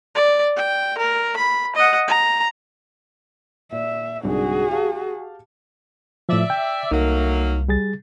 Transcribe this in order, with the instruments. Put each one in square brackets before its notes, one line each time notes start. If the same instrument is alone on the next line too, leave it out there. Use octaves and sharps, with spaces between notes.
[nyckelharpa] D5
G5
A#4
B5
D#5 F#5
A#5
[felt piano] A#2 [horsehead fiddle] E5
[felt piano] C2 G#2 D3 [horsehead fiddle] F#4 G#4
[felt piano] G4 F5 A5
[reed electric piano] A2 F3 [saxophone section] D5 E5
[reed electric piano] G5
[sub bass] C2 [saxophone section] F#3 A3 A#3 [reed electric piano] D#4
[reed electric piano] G3 G#4 A6